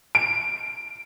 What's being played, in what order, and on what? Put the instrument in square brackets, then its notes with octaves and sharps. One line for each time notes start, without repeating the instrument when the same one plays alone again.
[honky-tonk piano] D7